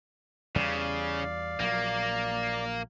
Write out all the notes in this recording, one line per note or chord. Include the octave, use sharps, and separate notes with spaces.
E2 C#3 G3 D5 F5
A#1 F#3 A#3